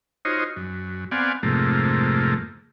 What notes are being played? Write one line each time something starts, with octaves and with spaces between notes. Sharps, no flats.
D#4 F4 F#4 C5 C#5 D#5
F#2
B3 C4 D5 F5 F#5 G#5
F2 G#2 C3 A3 A#3